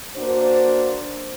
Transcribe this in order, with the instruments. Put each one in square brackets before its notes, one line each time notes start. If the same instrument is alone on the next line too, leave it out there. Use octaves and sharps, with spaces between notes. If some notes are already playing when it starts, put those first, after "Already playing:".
[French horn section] A#3 D4 F#4 C5